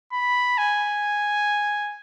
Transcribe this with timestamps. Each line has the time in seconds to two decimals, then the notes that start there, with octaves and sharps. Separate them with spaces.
0.12 B5
0.58 G#5